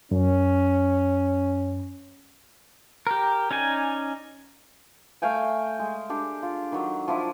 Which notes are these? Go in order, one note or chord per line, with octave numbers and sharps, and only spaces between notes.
F#2 C#4
G4 A#4
C#4 D#4 D5 G#5
A3 F5 G5 G#5
G#3
D4 G4 A4
F4
D#3 F#3
F3 D4 E4 F4